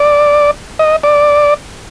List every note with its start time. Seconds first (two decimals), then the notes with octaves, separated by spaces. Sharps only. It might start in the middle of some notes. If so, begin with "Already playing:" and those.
Already playing: D5
0.79 D#5
1.03 D5